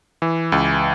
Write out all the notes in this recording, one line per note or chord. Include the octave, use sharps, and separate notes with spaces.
E3
C#2